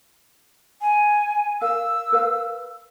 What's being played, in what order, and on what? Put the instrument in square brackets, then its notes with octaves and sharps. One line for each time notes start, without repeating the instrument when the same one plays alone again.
[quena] G#5
[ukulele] A#4 F5 [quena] E6
[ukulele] A#4 B4 F5